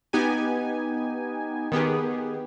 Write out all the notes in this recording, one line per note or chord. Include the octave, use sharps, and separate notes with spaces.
B3 D#4 G4 G#5
D#3 B3 G4 G#4